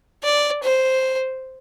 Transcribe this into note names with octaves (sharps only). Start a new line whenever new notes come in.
D5
C5